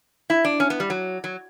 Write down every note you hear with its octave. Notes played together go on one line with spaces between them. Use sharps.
E4
D4
C#4
B3
G3
F#3
F#3